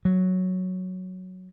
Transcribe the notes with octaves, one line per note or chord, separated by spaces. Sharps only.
F#3